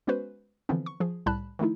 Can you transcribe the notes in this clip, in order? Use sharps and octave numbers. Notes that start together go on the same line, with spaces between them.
G#3 B3 C#4 F#4 B4 C5
D3 E3 F3 B3 C4
C#6
F3 G#4
C2 A2 G3 A5 B5 F#6
D#3 F3 A3 D#4 E4